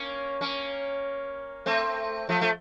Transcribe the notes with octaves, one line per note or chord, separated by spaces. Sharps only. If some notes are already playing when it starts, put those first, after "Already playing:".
Already playing: A#3 C#4
A#3 C#4
A3 C4
F3 A3
A3